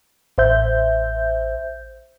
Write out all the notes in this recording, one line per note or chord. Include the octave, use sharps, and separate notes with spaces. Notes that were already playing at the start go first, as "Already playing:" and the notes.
A1 C5 E5 G6